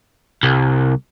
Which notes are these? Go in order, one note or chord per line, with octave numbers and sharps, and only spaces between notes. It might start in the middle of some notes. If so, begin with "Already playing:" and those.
C2